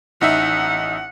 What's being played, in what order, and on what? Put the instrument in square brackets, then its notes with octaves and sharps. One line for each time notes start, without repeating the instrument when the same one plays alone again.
[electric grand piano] A1 D#4 E5 [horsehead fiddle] F#5